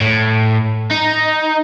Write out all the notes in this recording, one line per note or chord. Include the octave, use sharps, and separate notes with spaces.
A2
D#4